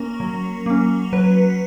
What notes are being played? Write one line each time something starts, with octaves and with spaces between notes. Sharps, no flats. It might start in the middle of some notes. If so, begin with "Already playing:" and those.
Already playing: A#3 C#4 A#4
F#3
A#3 C#4
F#3 B4